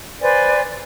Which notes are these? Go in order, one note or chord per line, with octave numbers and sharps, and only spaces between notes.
B4 C5 D5 G#5